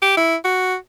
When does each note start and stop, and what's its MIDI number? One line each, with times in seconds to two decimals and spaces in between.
0.02 0.15 67
0.17 0.36 64
0.45 0.75 66